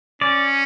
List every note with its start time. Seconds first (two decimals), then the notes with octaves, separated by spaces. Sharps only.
0.21 C#4 D5